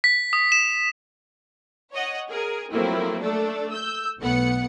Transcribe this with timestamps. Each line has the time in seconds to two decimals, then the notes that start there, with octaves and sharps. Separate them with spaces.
0.04 B6
0.33 D#6
0.52 E7
1.93 C#5 D#5 F#5
2.29 G#4 A#4
2.72 F3 F#3 A3 A#3 C4 E4
3.22 A3 D4 A4
3.71 E6 G6
4.20 B1 A3 B3 F#5 C#7